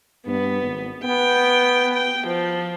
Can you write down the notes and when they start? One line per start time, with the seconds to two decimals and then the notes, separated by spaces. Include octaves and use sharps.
0.27 G2 B3
0.63 G#1
1.04 B3 G5
1.94 G5
2.27 F3